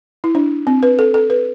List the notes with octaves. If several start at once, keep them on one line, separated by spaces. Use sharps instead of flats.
E4
D4
C4
B4
A4
A4
B4